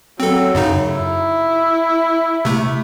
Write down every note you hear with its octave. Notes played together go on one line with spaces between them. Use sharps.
F#3 C4 A4
F#2 C#3 D#4
E4
C3 A3